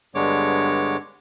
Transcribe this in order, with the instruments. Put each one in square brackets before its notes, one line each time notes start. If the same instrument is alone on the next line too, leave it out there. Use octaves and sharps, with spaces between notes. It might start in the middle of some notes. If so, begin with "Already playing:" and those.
[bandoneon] G2 D3 G#3 B3 C#5 D6